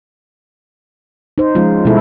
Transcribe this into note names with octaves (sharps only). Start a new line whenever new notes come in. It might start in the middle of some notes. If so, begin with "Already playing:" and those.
D#4 C5
F3 G#3 C#4 F4
B2 G3 G#3 B3 E4 A4